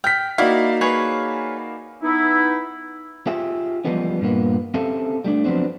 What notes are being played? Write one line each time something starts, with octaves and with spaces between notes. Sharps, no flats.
G5 F6 B6
A#3 D#4 E4 F#4 D5 F5
G#4 B4 C#5
B3 D#4 E4
F4 G4 G#4 E5
E3 F3 G3 G#3 B3 C#4
G2 A#2 A#3 B3
C4 C#4 G4 A4 E5 F5
G3 A3 D4
F3 F#3 B3 C4 D4